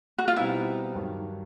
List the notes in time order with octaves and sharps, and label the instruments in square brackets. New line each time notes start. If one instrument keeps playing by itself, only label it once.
[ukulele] F#4
F4
[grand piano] B2 G3 C4 D#4 [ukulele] E4
[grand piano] G2 D#3 F#3